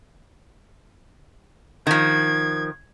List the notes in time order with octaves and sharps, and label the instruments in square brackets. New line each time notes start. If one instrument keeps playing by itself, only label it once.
[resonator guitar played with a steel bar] D#3 F3 [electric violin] G#6